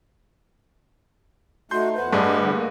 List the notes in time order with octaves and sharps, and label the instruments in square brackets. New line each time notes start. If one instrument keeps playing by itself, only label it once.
[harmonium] A3 D#4 [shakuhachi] F#4 [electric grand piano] C6 G6
[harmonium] E2 B4 C5 [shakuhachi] F#5
[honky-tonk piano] G2 [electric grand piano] A3 D4 G#4 [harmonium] C5 D5 D#5
[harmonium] E2 D3
A#3